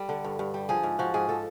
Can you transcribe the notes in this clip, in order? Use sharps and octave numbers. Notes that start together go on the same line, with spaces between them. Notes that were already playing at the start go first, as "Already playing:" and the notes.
Already playing: G3 A4
D3
G2
G2
G3
F3 G#4
G#2
F3 F#4
G#2 G#4
F3 A4